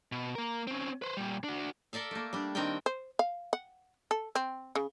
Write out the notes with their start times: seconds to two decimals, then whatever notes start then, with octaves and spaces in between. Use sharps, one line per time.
0.12 B2
0.35 A#3 A#4
0.67 C4 C#4
1.02 B4 C5
1.17 A#2 G3
1.44 D4 F#4
1.93 A4 A#4 D5 E5 F5
2.11 A3 A#3
2.33 G3 D4
2.55 D#3 C4 D4 A#4 F5 G5
2.86 C5
3.19 F5
3.53 F#5
4.11 A4
4.35 C4
4.75 C#3